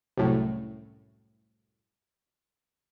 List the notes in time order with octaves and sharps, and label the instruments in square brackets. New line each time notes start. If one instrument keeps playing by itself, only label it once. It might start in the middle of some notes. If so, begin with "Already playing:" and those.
[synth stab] C2 F#2 A2